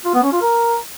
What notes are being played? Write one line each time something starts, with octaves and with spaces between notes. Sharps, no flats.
F4
B3
C#4
F4
A#4